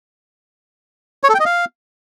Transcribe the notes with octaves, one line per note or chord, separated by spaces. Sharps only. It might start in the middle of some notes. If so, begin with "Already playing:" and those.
C#5
A4
G5
D#5
F5